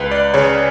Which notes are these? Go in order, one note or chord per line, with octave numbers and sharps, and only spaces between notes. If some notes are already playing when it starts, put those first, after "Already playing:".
Already playing: C#2 B4
D5
C#3 C#5